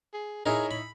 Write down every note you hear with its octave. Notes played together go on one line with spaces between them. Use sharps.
G#4
D#4 E4 G#4 A#4 C#5
B5